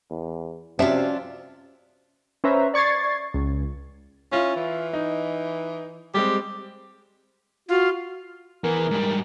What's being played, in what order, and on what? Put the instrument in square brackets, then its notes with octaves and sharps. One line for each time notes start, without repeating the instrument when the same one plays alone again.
[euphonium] E2
[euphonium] C3 [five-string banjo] F3 E5 [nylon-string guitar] C#4 F#4 [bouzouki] D4 F4
[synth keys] C#4 B4 C5 E5 A#5
D5 C#6 G#6 A6 C7
C#2
[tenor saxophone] C#4 [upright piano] E4 F4 F5
[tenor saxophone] E3
[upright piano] D#4
[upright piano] G3 G#3 C4 [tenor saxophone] G4
[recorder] F4 [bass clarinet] F#4
[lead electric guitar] E2 E3 [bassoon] A#4
[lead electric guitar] G#2 G3